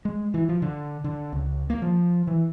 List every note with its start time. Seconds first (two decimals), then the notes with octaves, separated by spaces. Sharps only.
0.05 G#3
0.34 E3
0.49 F3
0.62 D3
1.04 D3
1.32 C#2
1.70 A#3
1.82 F3
2.27 E3